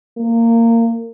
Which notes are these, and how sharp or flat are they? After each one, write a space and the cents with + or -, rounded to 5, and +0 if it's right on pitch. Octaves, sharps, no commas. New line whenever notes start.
A#3 -20